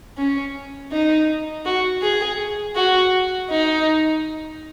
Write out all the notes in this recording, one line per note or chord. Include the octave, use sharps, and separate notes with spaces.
C#4
D#4
F#4
G#4
F#4
D#4